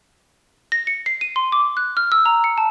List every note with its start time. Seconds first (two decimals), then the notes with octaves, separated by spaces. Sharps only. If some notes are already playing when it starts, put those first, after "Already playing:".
0.72 A#6
0.87 C#7
1.06 C7
1.21 D#7
1.36 C6
1.52 D6
1.77 F#6
1.97 F6
2.12 E6
2.26 A#5
2.44 C#7
2.58 A5